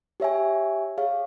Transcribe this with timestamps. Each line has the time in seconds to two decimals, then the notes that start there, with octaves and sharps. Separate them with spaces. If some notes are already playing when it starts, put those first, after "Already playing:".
0.20 G4 C#5 E5 G#5
0.98 G#4 C#5 F5